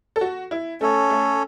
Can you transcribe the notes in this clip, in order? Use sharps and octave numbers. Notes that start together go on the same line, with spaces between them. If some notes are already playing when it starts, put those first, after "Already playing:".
A4
F#4
E4
A3 C#4 A4 C#5
A3